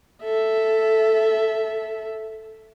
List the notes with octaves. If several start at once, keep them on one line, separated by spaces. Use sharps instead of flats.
A4 E5